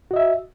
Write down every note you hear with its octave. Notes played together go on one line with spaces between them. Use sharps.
F#4 D#5 E5